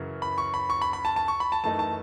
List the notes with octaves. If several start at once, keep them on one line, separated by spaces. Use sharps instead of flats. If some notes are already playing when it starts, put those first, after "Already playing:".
Already playing: F#2 C#3 E3
B5
C#6
B5
C#6
B5
B5
A5
A5
C#6
B5
A5
F#2 E3 A3 D#4 A5
A5